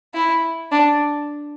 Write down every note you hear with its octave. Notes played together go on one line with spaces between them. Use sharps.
E4
D4